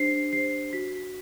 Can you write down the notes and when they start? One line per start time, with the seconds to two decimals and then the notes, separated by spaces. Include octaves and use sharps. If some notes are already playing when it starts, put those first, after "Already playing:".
Already playing: D4 G4 C5 C7
0.33 G4 C5 C7
0.73 F#4 B6